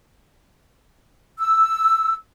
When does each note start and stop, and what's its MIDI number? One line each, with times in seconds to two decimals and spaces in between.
1.39 2.15 88